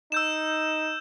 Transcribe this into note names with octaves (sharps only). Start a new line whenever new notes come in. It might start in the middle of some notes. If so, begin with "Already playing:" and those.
D#4 E6 G6 E7